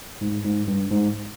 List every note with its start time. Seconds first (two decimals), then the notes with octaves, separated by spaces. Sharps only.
0.21 G#2
0.45 G#2
0.68 G2
0.90 G#2